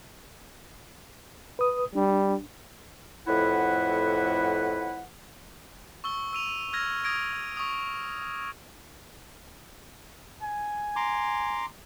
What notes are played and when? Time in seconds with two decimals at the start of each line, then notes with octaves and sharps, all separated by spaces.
1.59 B4 D#6
1.95 G3 D4
3.28 F2 A2 E4 B4 F#5
6.04 C#6 E6 G7
6.33 E6 D#7 F7
6.73 E6 F6 G#6 A#6
7.04 D#6 G#6 A#6 D7
7.57 C#6 D#6
10.43 G#5
10.96 A#5 C6 D6